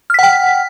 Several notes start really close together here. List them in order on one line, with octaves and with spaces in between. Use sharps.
F6 B6 F#5 G5